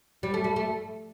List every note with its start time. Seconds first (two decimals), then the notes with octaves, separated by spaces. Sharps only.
0.23 G3
0.34 A3
0.44 G3
0.56 A3